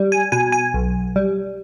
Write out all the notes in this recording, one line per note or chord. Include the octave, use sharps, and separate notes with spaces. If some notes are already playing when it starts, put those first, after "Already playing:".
Already playing: G3
G#5
B2 G#5
G#5
B1
G3